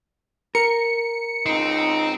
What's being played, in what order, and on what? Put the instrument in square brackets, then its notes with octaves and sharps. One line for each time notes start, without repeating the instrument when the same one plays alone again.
[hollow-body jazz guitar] A#4 [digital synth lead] C#7
[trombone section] C#2 D#4 [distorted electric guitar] C4